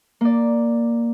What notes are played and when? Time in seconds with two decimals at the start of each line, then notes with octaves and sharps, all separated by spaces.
0.21 A#3 D5